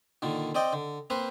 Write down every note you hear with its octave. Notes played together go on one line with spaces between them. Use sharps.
A#2 D3 D#3
C4 D5 D#5 G5
D3
A#3 C4 B4 C5